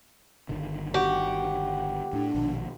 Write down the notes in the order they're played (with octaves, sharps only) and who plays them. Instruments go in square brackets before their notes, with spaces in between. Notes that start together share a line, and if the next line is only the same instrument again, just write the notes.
[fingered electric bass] G1 D3 D#3
[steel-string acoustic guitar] F#4 [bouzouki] G4
[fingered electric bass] A2 [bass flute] D4
[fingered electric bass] A#1 B2 D#3